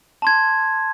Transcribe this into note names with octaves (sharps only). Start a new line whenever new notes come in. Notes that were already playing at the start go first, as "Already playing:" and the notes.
A5 C6 G#6